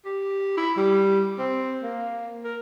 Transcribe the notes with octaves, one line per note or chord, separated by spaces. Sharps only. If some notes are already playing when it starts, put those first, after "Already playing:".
G4
E4
G3
C4
A#3
A#4